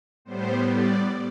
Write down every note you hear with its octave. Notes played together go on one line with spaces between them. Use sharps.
A2 G3 B3 C5
D5